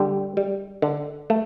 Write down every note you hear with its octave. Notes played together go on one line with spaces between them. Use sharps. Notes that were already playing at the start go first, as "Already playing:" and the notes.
Already playing: D3 G3 G4
G3
D3
A3